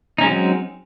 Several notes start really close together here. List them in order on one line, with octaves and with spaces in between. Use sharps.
D#4 C#4 G#3 F#3 C4